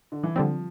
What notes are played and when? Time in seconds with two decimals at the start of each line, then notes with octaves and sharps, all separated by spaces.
0.12 D3
0.23 E3
0.36 D3 F3 G3 C4